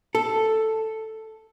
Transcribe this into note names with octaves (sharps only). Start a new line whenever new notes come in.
A4